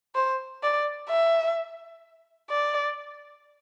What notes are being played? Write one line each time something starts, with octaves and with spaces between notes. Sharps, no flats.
C5
D5
E5
D5